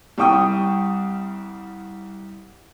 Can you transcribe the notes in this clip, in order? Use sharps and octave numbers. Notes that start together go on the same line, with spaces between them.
C2 G3 G5 C#6 D#6